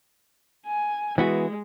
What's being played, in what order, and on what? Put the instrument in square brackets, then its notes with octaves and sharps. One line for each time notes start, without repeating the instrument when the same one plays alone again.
[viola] G#5
[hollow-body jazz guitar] E3 B3 F#4 [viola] G#3